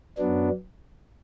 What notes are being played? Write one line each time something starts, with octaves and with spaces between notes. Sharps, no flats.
F#2 F#3 B3 D4